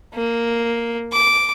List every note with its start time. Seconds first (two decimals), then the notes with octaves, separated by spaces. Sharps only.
0.14 A#3
1.13 D6